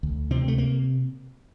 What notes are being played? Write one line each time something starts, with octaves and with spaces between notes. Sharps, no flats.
D2
C3 C4
A3
A#3